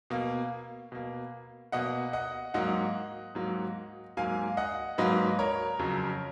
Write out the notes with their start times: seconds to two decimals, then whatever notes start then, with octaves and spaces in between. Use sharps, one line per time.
0.10 B2 A#3
0.92 B2 A#3
1.72 B2 A#3 D#5 F#5
2.13 D#5 F#5
2.54 G#2 F#3 A#3 D#5 F#5
3.35 G#2 F#3 A#3
4.17 G#2 F#3 A#3 F5 G#5
4.57 D#5 F#5
4.98 G#2 F#3 A#3 B4 D#5
5.39 A#4 C#5
5.79 F2 C#3 F#3